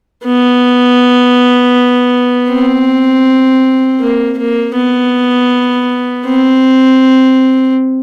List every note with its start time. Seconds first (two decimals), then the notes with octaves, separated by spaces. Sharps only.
0.25 B3
2.50 C4
4.01 A#3
4.38 A#3
4.76 B3
6.27 C4